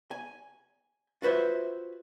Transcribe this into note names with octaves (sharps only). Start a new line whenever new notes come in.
G#5
F4 F#4 B4 C5 E5